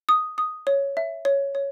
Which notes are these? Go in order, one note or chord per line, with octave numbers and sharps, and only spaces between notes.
D#6
D#6
C#5
E5
C#5
C#5